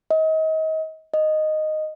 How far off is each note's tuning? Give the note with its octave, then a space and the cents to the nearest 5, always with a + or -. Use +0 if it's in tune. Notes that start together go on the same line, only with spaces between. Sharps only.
D#5 +30
D#5 -5